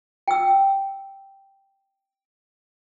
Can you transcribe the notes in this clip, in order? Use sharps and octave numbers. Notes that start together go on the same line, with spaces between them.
G5 E6